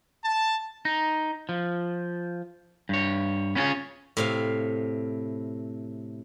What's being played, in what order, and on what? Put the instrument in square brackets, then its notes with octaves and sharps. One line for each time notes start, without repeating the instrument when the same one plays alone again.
[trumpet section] A5
[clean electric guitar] D#4
F3
G2 C#5
B3 C#4 E4 F4 G#4 C#5
[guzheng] A2 C3 F5